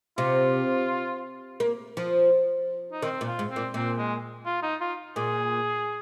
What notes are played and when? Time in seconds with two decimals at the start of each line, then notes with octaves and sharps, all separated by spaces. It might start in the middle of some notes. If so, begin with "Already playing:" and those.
0.18 C3 F4
1.60 A#3
1.97 F3
2.92 D#4
3.02 D#3 C4
3.21 A#2
3.27 F4
3.39 G#2
3.50 C4
3.56 A#2
3.74 A#2 C4
3.98 G#3
4.46 F4
4.63 D#4
4.81 F4
5.16 A#2 G#4